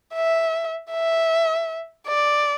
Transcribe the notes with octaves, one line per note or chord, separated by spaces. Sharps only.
E5
E5
D5